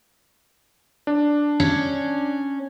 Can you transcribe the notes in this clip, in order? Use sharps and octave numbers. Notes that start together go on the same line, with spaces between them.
D4
C#4